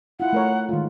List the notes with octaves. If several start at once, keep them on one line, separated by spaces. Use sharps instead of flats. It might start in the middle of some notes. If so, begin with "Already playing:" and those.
E4 F4 F#5
A3 A#4 C#5
D#3 G#3 F4